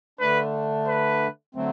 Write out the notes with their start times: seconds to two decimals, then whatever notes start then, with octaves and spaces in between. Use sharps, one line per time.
0.20 D3 A3 D4 B4
0.87 B4
1.55 D3 F#3 A3 C4